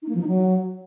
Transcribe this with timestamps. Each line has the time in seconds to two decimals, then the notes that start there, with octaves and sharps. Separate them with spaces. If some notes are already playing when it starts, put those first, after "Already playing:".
0.02 D#4
0.09 A#3
0.15 F3
0.21 D#4
0.28 F#3